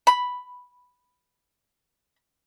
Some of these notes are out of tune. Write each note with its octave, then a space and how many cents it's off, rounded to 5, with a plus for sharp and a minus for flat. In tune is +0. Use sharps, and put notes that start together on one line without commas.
B5 +0